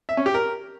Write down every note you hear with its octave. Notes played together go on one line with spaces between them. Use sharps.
E5
C#4
G4
A#4